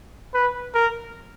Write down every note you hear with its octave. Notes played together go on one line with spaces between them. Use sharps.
B4
A#4